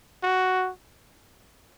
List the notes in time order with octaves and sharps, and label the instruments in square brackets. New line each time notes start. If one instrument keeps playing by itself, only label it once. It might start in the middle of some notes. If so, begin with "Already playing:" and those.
[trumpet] F#4